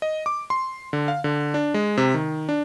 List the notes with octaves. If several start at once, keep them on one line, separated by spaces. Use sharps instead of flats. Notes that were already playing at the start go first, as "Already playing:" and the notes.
D#5
D6
C6
D3
F5
D3
D4
G#3
C3
D#3
D4